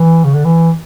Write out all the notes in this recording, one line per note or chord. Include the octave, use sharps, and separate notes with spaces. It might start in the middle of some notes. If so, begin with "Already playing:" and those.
Already playing: E3
C#3
D3
E3